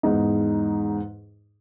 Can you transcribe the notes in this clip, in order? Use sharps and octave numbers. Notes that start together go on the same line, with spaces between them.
E2 G#2 D#4